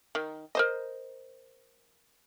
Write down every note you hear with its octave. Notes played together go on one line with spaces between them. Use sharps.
D#3
A#4 C5 D#5